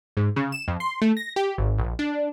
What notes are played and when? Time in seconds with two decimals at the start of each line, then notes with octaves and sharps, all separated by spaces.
0.17 G#2
0.36 C#3
0.52 E7
0.68 F2
0.80 C6
1.02 A3
1.17 A#6
1.36 G4
1.58 G#1
1.78 A#1
1.99 D4